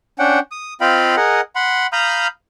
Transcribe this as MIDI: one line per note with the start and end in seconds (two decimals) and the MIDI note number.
0.19 0.39 61
0.19 0.39 62
0.19 0.39 78
0.19 0.39 79
0.52 0.74 87
0.81 1.16 60
0.81 1.16 65
0.81 1.16 75
0.81 1.16 77
0.81 1.16 79
0.81 1.16 83
1.17 1.41 68
1.17 1.41 70
1.17 1.41 75
1.17 1.41 78
1.56 1.87 78
1.56 1.87 83
1.56 1.87 84
1.93 2.27 77
1.93 2.27 82
1.93 2.27 83
1.93 2.27 87
1.93 2.27 89
1.93 2.27 91